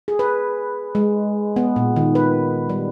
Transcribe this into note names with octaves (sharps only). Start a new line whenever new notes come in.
G#4
B4
G#3
B3
A#2
D#3
B4
G3